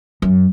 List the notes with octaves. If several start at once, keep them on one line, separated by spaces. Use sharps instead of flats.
F#2